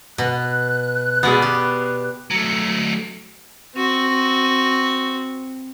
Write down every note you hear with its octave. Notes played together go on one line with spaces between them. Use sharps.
B2 F#6
B2 B3 G#4 D5
G4
F#3 A3
C4 F#4